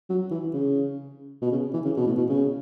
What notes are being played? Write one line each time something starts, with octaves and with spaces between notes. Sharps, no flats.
F#3
E3
C#3
B2
C#3
E3
C#3
B2
A2
B2
C#3